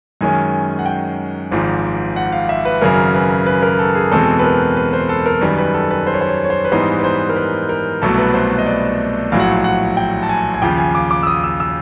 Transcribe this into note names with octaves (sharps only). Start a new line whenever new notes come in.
F#2 D#3 G#3 C#4 G#5
F#5
G5
G#1 G#2 F3
F#5
F5
E5
B4
G#1 F#2 C#3 F#3 A#4
B4
B4
A#4
A4
G#4
E2 B2 G#3 C4 A4
B4
A#4
B4
C5
A4
A#4
F#2 D#3 G3 B4
B4
A4
B4
C5
C#5
C5
C#5
C#5
C5
B4
G#2 E3 G3 B3 D#4 C5
B4
C5
A#4
B4
A#4
C2 B2 F#3 A3 A4
B4
C5
D#5
D5
A#1 A2 F#3 F5
F#5
F5
F#5
G5
A5
G#5
G#5
D#2 C#3 F3 G5
G#5
D6
D6
E6
D#6
E6
E6